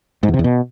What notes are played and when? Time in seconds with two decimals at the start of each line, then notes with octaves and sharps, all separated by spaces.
0.23 G#2
0.28 E2
0.34 C3
0.39 E2
0.44 B2